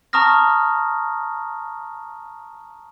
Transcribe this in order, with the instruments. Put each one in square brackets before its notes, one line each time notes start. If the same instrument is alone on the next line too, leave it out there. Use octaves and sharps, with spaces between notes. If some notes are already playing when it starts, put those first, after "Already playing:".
[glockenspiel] A5 A#5 C#6 D#6 F6 A#6